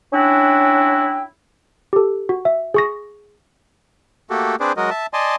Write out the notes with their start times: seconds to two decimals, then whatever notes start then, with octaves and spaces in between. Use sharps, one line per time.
0.12 C#4 D4 E4 F#4 G5
1.93 G4 A4
2.29 F#4
2.45 E5
2.74 G#4 C#6 A#6
4.30 A3 A#3 F#4 G4 A4
4.60 C4 D4 G#4 B4 C5 D5
4.77 F#3 G#3 F#4 A#4 D#5
4.90 E5 A5
5.14 D5 D#5 G#5 A5 C6